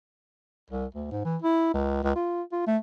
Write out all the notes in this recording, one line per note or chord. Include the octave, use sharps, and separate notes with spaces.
C2
D2
G#2
E3
E4
C#2
C#2
F4
F4
A3